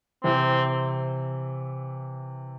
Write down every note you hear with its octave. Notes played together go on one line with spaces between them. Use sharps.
C3 E3 C4